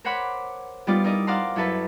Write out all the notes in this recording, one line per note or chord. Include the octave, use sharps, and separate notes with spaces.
A#4 C5 C#5 F#5 B5 D6
G3 B3 D#4 F4 D5
D#4 E4 A#4 D5 D#5
C5 D5 F5 F#5 A#5 C6
F#2 E4 A4 B4